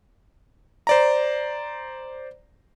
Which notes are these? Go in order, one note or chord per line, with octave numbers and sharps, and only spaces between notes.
C5 D5 A#5